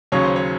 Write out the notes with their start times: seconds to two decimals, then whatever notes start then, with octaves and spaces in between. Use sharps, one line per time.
0.12 D#2 C#3 F#3 C#4 C#5
0.24 C5
0.36 C#5